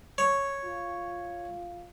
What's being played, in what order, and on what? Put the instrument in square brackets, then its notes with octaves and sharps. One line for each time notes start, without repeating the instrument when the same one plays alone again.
[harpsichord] C#5
[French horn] F4